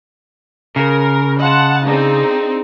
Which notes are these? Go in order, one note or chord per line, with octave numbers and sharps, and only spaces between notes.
C#3 A#4 A#6
D#5 F5 F#5 A5 C6
C4 D4 D#4 G#4 A4